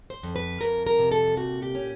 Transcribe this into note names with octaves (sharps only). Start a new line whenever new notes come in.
C5
F2
B4
F2 A#4
A#4
C3
A4
A#2 F#4
G4
C#4